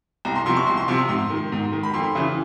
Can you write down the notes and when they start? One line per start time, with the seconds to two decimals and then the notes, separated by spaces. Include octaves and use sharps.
0.25 C2 A#5
0.35 C6
0.46 C3 F3 C6
0.57 C#6
0.67 C2 C6
0.77 C6
0.88 C3 F3 C6
1.09 G#2 C6
1.30 D#3
1.52 G#2
1.72 D#3
1.83 B5
1.94 F2 C6
2.15 C#3 E3